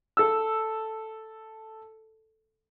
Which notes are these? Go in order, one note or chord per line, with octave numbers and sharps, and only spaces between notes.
A4 E6